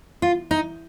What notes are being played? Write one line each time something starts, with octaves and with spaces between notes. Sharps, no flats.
F4
D#4